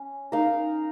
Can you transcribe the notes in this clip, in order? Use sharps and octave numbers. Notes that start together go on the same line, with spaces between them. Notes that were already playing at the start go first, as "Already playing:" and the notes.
Already playing: C#4
D#4 A#4 F5